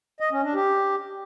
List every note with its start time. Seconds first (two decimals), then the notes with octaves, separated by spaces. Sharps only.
0.20 D#5
0.32 C#4
0.43 D4
0.54 G4